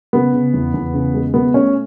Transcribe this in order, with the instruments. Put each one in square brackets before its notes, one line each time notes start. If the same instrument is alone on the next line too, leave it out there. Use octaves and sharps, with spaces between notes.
[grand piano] C#3 B3
C#3
E2
E2
C#3
G#3
B2 B3
A3 C#4